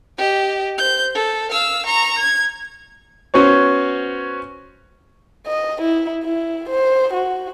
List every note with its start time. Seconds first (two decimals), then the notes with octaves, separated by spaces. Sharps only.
0.18 G4 D#5
0.78 C5 G6
1.15 A4
1.51 F5 E6
1.86 A#5 C#6
2.18 G#6
3.34 B3 C#4 F#4 C5 C#5
5.47 D#5
5.82 E4
6.24 E4
6.69 C5
7.13 F#4